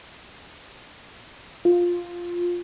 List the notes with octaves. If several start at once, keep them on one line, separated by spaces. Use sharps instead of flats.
F4